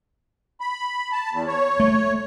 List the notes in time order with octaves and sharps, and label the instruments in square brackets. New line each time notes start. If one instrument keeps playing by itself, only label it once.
[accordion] B5
A5
E2
C#5
[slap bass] A3